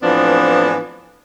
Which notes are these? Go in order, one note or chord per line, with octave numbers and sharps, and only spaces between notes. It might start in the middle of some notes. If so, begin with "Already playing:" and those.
A2 E3 F3 B3 C4 D4